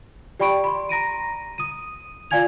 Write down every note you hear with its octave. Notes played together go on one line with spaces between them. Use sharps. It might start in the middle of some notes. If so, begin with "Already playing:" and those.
G4 D5 G5 B5 C#6 D7
B5 C6
A#5 A#6 D7 D#7
D#6 D#7
F4 D5 F5 G#5 G#6 F7